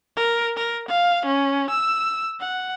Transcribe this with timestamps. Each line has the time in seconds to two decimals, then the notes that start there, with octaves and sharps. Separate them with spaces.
0.16 A#4
0.57 A#4
0.88 F5
1.25 C#4
1.70 E6
2.40 F#5